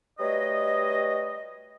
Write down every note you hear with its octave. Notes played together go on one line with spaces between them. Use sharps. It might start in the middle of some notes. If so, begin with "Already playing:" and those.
F#3 G3 A3 B4 D#5